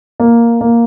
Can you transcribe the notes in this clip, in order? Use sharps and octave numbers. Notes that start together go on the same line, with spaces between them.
A#3
A#3